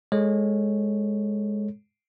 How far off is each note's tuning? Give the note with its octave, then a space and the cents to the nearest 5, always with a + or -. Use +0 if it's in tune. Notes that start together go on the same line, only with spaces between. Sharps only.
G#3 +0 A4 +0 C#5 -10